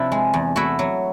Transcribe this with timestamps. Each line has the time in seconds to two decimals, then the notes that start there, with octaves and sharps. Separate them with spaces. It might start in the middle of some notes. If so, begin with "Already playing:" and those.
Already playing: C3 F3 D4 E4
0.12 G#3
0.34 E2
0.56 A3 E4 F#4
0.79 F#3